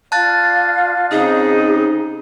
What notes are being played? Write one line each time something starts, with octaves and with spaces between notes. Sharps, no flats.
F4 D5 F5 A5 F#6 A6
C#3 C4 D#4 G#4